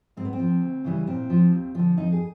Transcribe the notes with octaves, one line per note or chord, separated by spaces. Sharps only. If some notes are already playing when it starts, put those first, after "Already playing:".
G#2 C4
B3
C4
F3
D2
C#3 E3 G3
A#2 C4
F3
D#2
D3 F3
F2 D#4
G#4